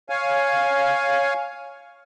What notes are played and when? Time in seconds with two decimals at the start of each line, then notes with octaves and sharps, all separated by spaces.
0.09 C#5 F5 G#5